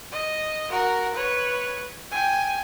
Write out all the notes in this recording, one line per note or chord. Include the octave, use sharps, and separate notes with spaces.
D#5
F#4 A#4
B4 C#5
G5 G#5